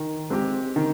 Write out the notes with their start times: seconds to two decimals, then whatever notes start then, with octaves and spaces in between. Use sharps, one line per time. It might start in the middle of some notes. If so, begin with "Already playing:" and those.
Already playing: D#3
0.30 G#3 C4 G4
0.76 D#3